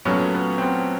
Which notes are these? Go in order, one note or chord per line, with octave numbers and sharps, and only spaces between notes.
A#2 F#3 A3 B3 C#4
B3
C4
B3